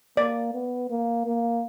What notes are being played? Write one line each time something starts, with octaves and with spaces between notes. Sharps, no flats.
A#3 D5
B3
A#3
A#3